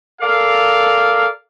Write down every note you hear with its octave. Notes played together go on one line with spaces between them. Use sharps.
A4 A#4 D5 F5